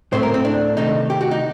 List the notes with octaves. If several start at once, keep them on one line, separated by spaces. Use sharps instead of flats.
A2 A3 C4 C5
A#4
C4
D4
C3 D#3 A3 C4 D#4
G4
F#4
D#4